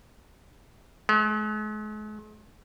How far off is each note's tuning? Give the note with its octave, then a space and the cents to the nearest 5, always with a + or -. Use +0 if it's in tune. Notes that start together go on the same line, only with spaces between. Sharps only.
G#3 +45